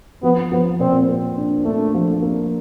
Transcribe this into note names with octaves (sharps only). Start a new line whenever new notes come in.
F3 B3
F3 B3
A#2 C4
A#3
D4
A3 D4
F3
A#3